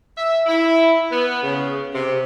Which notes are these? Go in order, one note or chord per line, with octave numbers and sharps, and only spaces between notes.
E5
E4
B3
C#3
C3